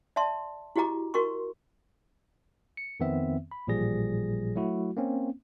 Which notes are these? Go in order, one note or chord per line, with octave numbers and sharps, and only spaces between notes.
D5 E5 A5 C6
E4 F#4 G4 D#5 A#5 D6
F#4 A#4 D#5 C6 C#6
C#7
F2 D#3 B3 C4 E5
B5
A1 A#2 F3 G3 G#4 A#6
F#3 A3 E4 F#4
A#3 C4 C#4